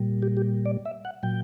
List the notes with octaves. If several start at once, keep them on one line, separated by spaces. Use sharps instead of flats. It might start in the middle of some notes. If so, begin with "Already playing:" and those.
Already playing: A#2 G3
G4
G4
D5
E5
F#5
A#2 F#3 G5